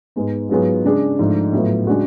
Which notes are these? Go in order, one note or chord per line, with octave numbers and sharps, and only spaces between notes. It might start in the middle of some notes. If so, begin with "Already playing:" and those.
G#2 G#3 B3
G#2 F#3 B3 F4 G#4
C#3 G#3 D4 G#4
G#2 F3 A3 D4
A2 F#3 B3 F4
C#3 G#3 D4 F#4